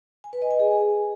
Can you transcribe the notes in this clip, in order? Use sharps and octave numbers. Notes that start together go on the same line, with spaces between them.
G#5
B4
D#5
G#5
G#4